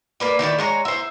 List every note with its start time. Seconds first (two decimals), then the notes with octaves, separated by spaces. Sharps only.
0.20 A#3 B4 D5
0.39 D#3 E4 F#4 D5
0.58 G#3 C#5 A#5
0.85 E4 C5